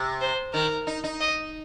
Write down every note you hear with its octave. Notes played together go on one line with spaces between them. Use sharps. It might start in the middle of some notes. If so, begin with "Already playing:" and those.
Already playing: C3
C5
D#3 A#4
D#4
D#4
D#5